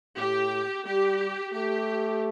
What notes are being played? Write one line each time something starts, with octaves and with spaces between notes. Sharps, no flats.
A2 G4
G3 G4
A3 G4